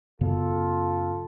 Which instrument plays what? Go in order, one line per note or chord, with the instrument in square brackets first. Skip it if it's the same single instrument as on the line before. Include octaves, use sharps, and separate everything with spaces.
[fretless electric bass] F#2 C#3 B3 [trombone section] F4 A4